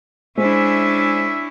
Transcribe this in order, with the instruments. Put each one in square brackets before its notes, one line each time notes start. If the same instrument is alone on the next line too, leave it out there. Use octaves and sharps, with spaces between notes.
[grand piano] G#3 [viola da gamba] C#4 D4 E4 [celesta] C5 [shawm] E5